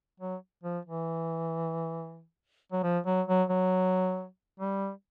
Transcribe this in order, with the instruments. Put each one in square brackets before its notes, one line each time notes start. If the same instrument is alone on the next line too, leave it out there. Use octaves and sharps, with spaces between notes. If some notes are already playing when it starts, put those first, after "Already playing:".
[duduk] F#3
F3
E3
F#3
F3
F#3
F#3
F#3
G3